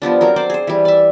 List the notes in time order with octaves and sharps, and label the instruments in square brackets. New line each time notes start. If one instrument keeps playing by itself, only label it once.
[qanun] F3 G3 B3 D4
F#3 C4 A#4
A4 C5 D5 D6
G#4 C5
E3 G3
D5 E5